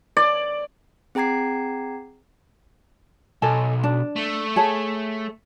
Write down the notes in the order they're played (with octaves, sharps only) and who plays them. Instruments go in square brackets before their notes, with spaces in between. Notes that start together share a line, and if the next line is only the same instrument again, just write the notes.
[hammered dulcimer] D5
[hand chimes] C4 G#4 G5 A#5 G#6 C7
[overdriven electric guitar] B1 [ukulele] A4 D#5 G#5
[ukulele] D4
[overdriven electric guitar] A3
[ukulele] G#4 C#5 A5